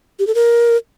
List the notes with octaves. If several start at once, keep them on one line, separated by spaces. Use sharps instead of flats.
G4
A4
A#4